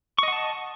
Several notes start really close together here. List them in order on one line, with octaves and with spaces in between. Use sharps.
C#6 D#5 F#5 A5